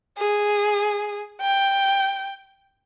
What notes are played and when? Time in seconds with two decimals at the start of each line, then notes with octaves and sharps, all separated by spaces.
0.18 G#4
1.41 G5